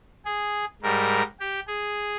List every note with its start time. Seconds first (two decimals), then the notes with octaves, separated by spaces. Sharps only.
0.25 G#4
0.82 G#2 G3 A#4
1.40 G4
1.67 G#4